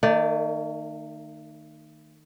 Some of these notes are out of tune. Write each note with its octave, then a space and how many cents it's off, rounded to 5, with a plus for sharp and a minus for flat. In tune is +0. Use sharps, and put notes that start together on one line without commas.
D#3 -15 A3 +45 D5 +0